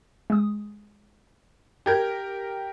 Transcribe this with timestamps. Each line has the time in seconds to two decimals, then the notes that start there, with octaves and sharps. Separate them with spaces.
0.30 G#3 D#6
1.86 G4 A#4 G5 G6 G#6